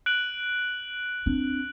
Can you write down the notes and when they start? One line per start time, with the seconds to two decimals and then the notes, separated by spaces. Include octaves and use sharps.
0.06 F#6 D7 F#7
1.26 C4 D4